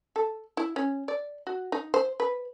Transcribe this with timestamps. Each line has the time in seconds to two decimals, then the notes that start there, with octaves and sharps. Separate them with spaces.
0.16 A4
0.57 E4
0.76 C#4
1.08 D5
1.47 F#4
1.72 D#4
1.94 C5
2.20 B4